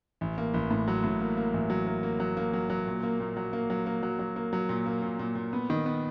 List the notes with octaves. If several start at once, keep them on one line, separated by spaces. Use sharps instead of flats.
A1
A#3
A1
A2
F#3
A2
A#3
A#3
A1
F#3
A#3
A#3
F#3
A#3
F#3
F#3
A#2
A#3
A#2
F#3
A#3
F#3
A#3
F#3
F#3
A#3
F#3
A#2
A#3
A#2
A#2
A#2
B3
D#3
B3